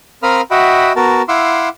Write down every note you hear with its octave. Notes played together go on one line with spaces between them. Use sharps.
C4 A#4 F5 B5 D#6 F6
F#4 D#5 E5 F#5 G5 B5
B3 F#4 A#4 A5
E4 F5 F#5 C6 D6 E6